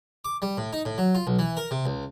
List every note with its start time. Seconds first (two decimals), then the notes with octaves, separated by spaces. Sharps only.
0.25 D6
0.42 G3
0.57 A2
0.73 D#4
0.85 A2
0.98 F#3
1.15 F4
1.27 B1
1.39 E3
1.57 A#4
1.71 C3
1.86 C#2